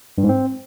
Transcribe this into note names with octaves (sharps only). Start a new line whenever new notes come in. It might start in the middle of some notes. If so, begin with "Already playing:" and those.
G2
G#2
C4